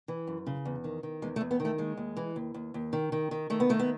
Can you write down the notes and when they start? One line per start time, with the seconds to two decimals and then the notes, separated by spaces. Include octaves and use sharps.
0.08 E3
0.27 F#2
0.46 C#3
0.65 E2
0.84 D#3
1.03 D#3
1.22 E2 G#3
1.36 A3
1.41 E2
1.51 B3
1.60 D#3
1.65 A3
1.78 D#2 G#3
1.97 D#2
2.17 E3
2.36 D#2
2.54 D#2
2.74 D#2
2.93 D#3
3.12 D#3
3.31 D#3
3.50 D#3 A3
3.60 B3
3.69 D#3 A3
3.79 B3